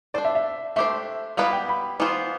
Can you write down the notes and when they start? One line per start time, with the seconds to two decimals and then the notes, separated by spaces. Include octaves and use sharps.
0.14 D4 A4 C5 D5
0.25 E5
0.35 E5
0.76 A3 D4 G4 C5 E5
1.37 G3 B3 E4 B4 D5 F5
1.53 G5
1.69 B5
2.00 E3 B3 F4 C5